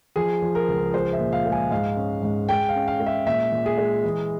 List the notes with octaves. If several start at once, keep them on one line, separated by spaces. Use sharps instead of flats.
F3 G#4
F3
A#4
C#2
G#3 C5
E5
A#2
F5
G#3
G#5
G#2 F5
C#4
G#2
G#3 G5
F5
C#4
F5
G#3
E5
A#2 E5
A#2
G#4
G#3
E3